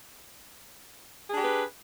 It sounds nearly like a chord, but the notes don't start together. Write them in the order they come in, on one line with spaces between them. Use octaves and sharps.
G#4 D4 G4 B4